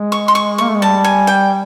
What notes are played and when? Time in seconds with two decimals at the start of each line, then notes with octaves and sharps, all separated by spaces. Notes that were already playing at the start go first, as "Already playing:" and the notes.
Already playing: G#3
0.12 C#6
0.28 C6
0.35 C#6
0.58 A#3 C#6
0.68 A3
0.74 G#3
0.82 G3 A5
1.04 G#5
1.27 G5